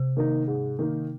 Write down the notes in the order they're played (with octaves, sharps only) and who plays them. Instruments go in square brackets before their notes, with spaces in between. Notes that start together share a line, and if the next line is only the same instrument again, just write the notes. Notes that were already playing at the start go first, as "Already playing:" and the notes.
Already playing: [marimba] C3
[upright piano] D#3 A#3 D#4
G#2
D#3 A#3 D#4